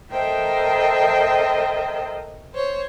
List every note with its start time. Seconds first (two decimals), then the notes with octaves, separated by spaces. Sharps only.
0.12 A4 A#4 C5 D#5 E5 G5
2.54 C5 C#5